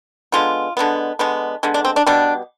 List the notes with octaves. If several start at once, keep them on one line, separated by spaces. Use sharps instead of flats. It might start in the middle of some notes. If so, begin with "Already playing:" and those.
D3 G#3 B3 F4
D3 G#3 B3
D3 G#3 B3
D3 G#3 B3
D4
C4
D4
B2 G3 B3 D4